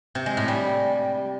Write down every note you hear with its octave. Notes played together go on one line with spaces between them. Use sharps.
C3
G#3
A2
G3